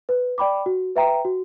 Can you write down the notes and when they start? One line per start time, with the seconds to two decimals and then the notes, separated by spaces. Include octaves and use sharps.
0.09 B4
0.38 D5 G5 B5 D6
0.66 F#4
0.96 B4 E5 G5 A#5
1.25 F#4